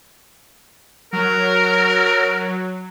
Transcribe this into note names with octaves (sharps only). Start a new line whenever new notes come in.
F#3 A#4